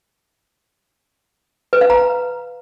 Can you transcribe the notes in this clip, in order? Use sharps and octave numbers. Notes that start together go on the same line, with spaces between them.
B4
F5
A#5